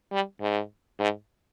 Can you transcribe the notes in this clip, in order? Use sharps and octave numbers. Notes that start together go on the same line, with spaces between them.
G3
G#2
G#2